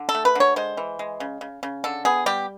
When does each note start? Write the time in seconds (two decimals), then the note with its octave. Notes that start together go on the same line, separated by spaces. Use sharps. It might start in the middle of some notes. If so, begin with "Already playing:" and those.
Already playing: D3
0.09 A4
0.15 A3
0.25 B4
0.35 D3 C#5
0.56 G#3 C5
0.77 E3
0.99 G#3
1.20 C#3
1.41 C#3
1.63 C#3
1.84 D3 A4
2.05 B3 G#4
2.26 G3 G4